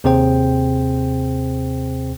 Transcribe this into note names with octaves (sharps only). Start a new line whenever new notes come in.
D#2 C3 C4 G#4 C5 G5